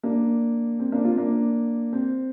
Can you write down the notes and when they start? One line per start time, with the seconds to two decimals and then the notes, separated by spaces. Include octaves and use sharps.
0.03 A#3 D4
0.79 C4
0.92 A#3 D4
1.04 C4 F4
1.17 A#3 D4
1.93 C4